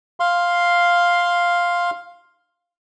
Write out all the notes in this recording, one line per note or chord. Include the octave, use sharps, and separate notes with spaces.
F5 C6